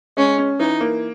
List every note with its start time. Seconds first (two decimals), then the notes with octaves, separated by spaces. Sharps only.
0.17 G#3 C#4
0.38 C#4
0.59 E3 D#4
0.80 A#3